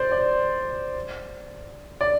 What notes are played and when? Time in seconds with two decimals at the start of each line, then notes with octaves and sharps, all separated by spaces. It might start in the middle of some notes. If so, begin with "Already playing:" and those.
Already playing: C5 D5
0.12 D5
2.01 D5